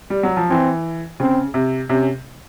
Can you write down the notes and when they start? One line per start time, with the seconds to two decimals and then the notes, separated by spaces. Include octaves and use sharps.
0.10 G3
0.23 F#3
0.37 F3
0.50 E3 C4
1.20 C#3 C4
1.54 C3
1.89 C3 C#4